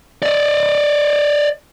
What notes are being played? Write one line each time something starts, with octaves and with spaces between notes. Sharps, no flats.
D5 D#5